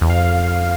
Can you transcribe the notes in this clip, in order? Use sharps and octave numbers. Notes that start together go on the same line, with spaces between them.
E2
F2 F5